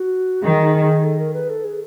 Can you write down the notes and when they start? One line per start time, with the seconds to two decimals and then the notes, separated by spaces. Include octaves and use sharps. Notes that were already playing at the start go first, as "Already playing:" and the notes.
Already playing: F#4
0.43 D#3 G#4
1.04 A4
1.19 A#4
1.34 B4
1.50 A4
1.64 G#4